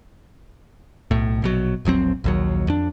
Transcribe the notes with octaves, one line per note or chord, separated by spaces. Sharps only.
B1 A2
A#1 B2 F#3
E1 A#1 F#3 C4
A#1 D#2 F#3
F2 D4